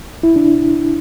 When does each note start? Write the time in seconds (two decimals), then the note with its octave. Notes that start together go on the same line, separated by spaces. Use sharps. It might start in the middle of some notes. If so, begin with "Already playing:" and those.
0.23 E4
0.36 D4